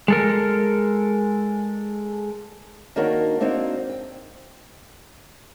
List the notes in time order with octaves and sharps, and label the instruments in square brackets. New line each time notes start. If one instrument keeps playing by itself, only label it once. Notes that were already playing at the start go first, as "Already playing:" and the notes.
[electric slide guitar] G#3 A4 A#4
[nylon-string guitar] D#3 A#3 D4 F#4 A#4 C#5
A#3 C4 D4 D#4 F#4
G5